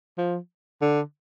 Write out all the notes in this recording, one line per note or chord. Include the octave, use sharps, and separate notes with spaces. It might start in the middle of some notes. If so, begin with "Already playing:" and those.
F3
D3